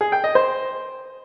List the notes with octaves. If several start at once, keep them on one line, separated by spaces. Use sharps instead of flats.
G#4
G5
D#5
C5